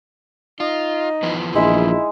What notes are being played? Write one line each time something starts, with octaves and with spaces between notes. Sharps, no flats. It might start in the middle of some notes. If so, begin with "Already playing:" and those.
D#4 F4
E3 F3 B3
A#1 G#3 D#4 E4